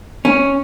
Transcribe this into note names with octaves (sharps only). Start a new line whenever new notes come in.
C#4